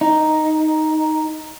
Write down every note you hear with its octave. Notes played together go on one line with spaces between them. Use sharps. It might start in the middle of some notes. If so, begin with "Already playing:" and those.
D#4